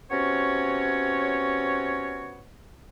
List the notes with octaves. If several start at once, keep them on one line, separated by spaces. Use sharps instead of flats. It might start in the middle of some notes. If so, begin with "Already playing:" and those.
C3 B3 C#4 F#4 C#5